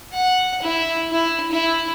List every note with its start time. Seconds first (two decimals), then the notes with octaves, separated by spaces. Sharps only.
0.13 F#5
0.62 E4
1.10 E4
1.51 E4